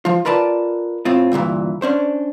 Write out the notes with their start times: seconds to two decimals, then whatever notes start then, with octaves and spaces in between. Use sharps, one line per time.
0.05 F3 F4
0.25 F4 A#4 B4 D5 A5
1.05 A2 C4 F4
1.32 D2 G2 A#2 E3
1.82 C#4 D4 C5